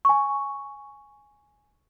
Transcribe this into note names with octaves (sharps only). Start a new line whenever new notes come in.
G#5 C#6